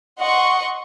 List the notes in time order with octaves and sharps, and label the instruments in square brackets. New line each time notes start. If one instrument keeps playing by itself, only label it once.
[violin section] D#5 F#5 C6 C#6